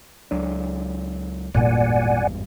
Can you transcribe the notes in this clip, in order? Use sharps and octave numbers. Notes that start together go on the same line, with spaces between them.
C#2 F#3 D4
G#1 E2 G2 A#2 A#3 D5 F#5 G#5